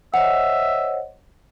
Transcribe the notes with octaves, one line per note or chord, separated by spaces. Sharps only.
C5 C#5 D#5 E5 F#5